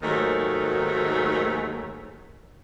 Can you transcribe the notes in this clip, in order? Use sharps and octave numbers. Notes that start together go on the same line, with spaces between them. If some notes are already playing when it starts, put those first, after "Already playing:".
D#2 G#2 D#3 F#3 A3